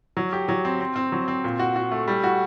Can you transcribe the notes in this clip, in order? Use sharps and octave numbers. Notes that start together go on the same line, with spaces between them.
F#3
G4
F#3
C4
C4
C4
F#3
C4
A#2
F#4
F#4
A3
G3
F#4